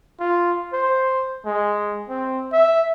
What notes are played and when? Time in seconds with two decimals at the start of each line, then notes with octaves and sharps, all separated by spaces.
0.20 F4
0.73 C5
1.46 G#3
2.09 C4
2.53 E5